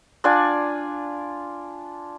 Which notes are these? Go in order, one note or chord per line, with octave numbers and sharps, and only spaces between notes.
D4 F4 D5 G#5